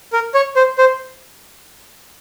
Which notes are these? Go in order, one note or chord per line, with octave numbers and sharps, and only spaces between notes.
A#4
C#5
C5
C5